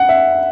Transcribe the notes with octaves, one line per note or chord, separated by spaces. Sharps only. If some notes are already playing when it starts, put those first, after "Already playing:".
Already playing: F#5
E5